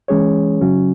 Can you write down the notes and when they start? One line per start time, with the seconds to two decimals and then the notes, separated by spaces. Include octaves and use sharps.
0.08 E3 G#3 C#4 G#4 C#5
0.61 C#3 F#3 C#4 F#4